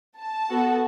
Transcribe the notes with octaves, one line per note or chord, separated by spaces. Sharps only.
A5
B3 F#4 A4